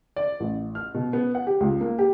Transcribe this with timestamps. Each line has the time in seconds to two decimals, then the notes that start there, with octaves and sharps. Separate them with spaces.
0.16 D5
0.40 A1
0.75 F6
0.94 B2
1.13 B3
1.35 F#5
1.47 G4
1.60 C#2
1.81 A#3
1.99 G4